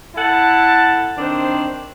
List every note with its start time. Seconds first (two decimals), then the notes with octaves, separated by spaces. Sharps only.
0.16 E4 A4 F#5 A5
1.17 D#3 C4 D4 C5